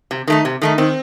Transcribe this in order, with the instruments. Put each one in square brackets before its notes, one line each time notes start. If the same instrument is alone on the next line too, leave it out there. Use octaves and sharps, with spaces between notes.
[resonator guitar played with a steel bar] C3
D#3 A3 D#4
C3
D#3 A3 D#4
[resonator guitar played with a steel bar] D#3 [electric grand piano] C4